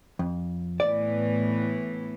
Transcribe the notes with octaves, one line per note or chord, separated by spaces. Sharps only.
F2
A2 E3 B3 D5